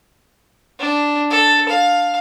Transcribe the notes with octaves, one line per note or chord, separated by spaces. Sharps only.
D4
A4
F5